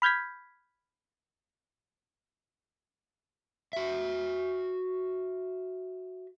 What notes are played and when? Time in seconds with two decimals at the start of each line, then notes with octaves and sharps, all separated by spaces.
0.02 B5 F6 G6 G#6 B6
3.73 F#4 E5